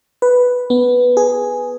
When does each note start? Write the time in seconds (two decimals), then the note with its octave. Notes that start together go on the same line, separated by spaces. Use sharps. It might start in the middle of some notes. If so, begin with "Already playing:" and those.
0.22 B4
0.70 B3
1.17 G#4